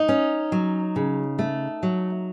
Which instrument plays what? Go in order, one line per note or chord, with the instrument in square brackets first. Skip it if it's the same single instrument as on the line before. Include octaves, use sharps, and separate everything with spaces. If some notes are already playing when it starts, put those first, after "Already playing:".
Already playing: [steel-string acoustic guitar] D#4
C#4
F#3
C#3
A3
F#3